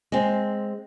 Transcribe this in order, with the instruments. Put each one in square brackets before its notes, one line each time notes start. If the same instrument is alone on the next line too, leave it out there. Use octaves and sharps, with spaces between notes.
[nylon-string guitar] G#3 C4